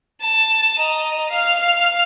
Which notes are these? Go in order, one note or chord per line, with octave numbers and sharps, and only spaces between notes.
A5
D#5 A#5
F5 F6